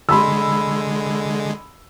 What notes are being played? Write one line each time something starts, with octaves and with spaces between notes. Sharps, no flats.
D3 G#3 B5 C6 E6